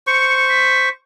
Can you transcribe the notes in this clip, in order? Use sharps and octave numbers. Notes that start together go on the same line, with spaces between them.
C5 C#6 C#7
B6